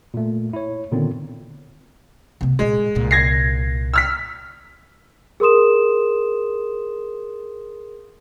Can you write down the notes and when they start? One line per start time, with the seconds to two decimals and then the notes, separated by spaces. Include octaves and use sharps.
0.14 A#2 A3
0.53 E4 C#5
0.92 A#2 D3 D#3 B3 C4
2.41 C3 B3
2.59 A1 A#2 G#3
2.95 C2 A#2
3.11 G#6 A#6 C7
3.94 E6 F6 B6
5.40 G#4 A#4 C6 D#6 E7